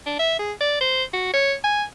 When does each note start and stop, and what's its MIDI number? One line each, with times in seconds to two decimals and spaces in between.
0.06 0.18 62
0.19 0.39 76
0.39 0.52 68
0.61 0.80 74
0.81 1.04 72
1.14 1.29 66
1.34 1.54 73
1.64 1.83 80